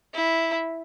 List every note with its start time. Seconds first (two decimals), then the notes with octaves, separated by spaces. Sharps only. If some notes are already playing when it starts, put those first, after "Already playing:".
0.14 E4